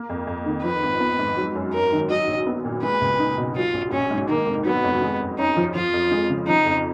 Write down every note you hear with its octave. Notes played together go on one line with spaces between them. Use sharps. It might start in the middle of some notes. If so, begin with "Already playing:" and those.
Already playing: A#3
F2
F2
D#3
F3 B4
G#1
B3
G#2
F#3
F#2
F#2 A#4
D#3
F#3 D#5
A#1
B3
A#2
G#3 B4
C#2
D#4
B2
F#3 F4
A#1
A#1 C#4
G#2
D#3 A#3
F1
F#3 B3
F2
G#3
F#2
C#4 D#4
F3
F3 F4
F2
G#3
C#3
F3 D#4
F2